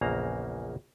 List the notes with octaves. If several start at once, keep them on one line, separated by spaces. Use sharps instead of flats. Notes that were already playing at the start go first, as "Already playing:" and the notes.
A#1 E2 C#3 A#3 A#5